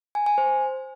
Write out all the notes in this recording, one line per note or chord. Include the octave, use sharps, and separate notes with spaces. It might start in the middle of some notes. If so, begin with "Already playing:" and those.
G#5
G#5
C5